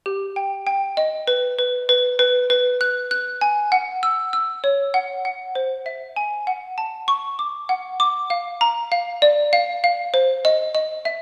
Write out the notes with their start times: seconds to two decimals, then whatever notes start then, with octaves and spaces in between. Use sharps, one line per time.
0.06 G4
0.36 G5
0.67 G5
0.97 D#5
1.27 B4
1.59 B4
1.89 B4
2.19 B4
2.50 B4
2.81 F#6
3.11 F#6
3.41 G#5
3.72 F#5
4.03 E6
4.33 E6
4.64 C#5
4.94 F#5
5.25 F#5
5.55 C5
5.86 E5
6.16 G#5
6.47 F#5
6.78 A5
7.08 C#6
7.39 D6
7.69 F#5
8.00 D6
8.30 F5
8.61 A#5
8.92 F5
9.22 D5
9.53 F5
9.84 F5
10.14 C5
10.45 D#5
10.75 D#5
11.05 E5